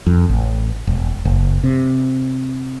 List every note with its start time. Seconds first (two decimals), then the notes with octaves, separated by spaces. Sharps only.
0.07 F2
0.29 A1
0.87 E1
1.25 F#1
1.64 C3